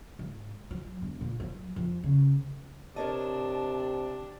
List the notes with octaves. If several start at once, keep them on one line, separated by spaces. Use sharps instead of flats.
G#2
F#3
E1
A#2
F#3
F2
C#3
C3 D4 A#4 C#5 D#5 A5